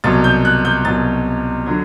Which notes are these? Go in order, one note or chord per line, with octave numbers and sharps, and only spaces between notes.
C2 B2 F#3 A6
G6
F#6
G6
C2 B2 F#3 A6
D3 F#3